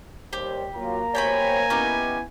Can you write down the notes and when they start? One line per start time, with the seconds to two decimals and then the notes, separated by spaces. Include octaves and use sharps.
0.33 D#2 G3 G4 C5
0.75 F#3 A#3 F4 A#5
1.15 B2 G4 C5 C#5 G5 G#5 B5
1.70 B3 C#4 D#4 E4 G4